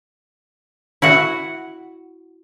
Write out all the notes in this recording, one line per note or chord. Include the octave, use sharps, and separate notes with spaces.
E4 F#4 F#5